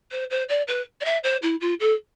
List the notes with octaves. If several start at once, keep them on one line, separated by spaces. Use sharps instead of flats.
C5
C5
D5
B4
D5
E5
C5
E4
F4
A4